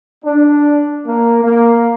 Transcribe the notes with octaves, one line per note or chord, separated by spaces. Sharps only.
D4
A#3
A#3